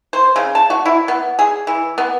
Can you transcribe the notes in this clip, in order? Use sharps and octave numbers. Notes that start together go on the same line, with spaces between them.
C5
C#3
A5
F#4
E4
B3
G#4
E3
B3